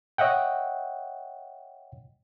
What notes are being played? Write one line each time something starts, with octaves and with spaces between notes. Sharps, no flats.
C#5 D#5 E5 F#5 G5